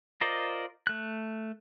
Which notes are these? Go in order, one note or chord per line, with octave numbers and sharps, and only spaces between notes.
F4 A#4 C5 D5 D#5
A3 F#6